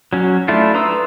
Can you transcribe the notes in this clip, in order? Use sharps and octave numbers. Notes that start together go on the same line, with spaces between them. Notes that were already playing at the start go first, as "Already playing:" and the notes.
F#3 C#4
A3 D4 E4 F4
B4 A#5 C6 D#6 E6